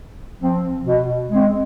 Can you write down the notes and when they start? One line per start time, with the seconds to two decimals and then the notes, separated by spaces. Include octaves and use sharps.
0.40 F3 C4
0.85 B2
1.30 G#3 C4